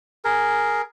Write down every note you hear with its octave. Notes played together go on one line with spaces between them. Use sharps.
G#4 A#4